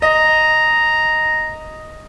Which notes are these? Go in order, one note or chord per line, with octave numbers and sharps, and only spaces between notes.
D#5 A#5